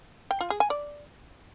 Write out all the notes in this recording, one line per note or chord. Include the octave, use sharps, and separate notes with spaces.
G5
F4
G#4
G#5
D5